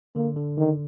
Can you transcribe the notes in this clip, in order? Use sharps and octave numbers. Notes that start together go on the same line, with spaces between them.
D3 A#3
D3
D3 D#3